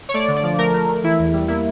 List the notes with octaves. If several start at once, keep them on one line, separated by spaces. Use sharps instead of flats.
C#5
A3 D5
D3
D5
F3
A3 A#4
A3
A3
E3 E4
E2
G3
A#3 E4